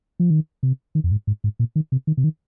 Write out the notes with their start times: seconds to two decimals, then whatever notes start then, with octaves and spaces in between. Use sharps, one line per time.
0.20 F3
0.30 D#3
0.63 C3
0.95 D#3
1.04 F2
1.12 G#2
1.27 G#2
1.44 G#2
1.59 A#2
1.76 D#3
1.92 C3
2.07 D#3
2.17 C3
2.24 D#3